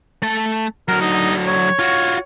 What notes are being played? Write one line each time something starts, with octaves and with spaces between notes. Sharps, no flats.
A3 A5
D3 F#3 A#4
D#4
C#5
F4 F#4